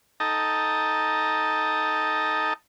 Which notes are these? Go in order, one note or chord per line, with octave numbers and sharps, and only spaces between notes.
D#4 A4 D#5 G5 A5 A#5